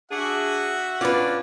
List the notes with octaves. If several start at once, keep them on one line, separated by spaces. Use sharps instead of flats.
D4 F#4 G#4 E5 F#5
C#4 D4 F4 B4 D5